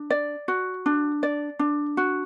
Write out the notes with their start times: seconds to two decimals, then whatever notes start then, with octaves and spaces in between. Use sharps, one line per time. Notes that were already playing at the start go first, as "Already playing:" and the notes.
Already playing: D4
0.10 D5
0.48 F#4
0.86 D4
1.23 D5
1.59 D4
1.97 F#4